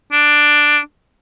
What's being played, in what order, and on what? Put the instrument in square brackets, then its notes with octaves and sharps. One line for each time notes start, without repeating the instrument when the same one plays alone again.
[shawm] D4